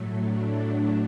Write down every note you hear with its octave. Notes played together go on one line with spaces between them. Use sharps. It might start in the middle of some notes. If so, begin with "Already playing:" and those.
Already playing: A2 F#3 A3
D4